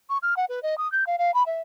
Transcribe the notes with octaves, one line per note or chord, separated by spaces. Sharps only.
C#6
F6
F#5
B4
D#5
D#6
G6
F5
F5
B5
E5